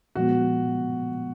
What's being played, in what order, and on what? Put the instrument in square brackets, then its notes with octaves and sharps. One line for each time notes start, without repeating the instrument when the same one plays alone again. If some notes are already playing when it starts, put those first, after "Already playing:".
[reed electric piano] A#2 F3 G#3 B3 [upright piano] F#4